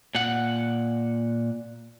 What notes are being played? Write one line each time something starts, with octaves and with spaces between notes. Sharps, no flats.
A#2 F#5